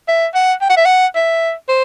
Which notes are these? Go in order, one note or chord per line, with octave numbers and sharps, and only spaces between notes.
E5
F#5
G5
F#5
E5
F#5
E5
C5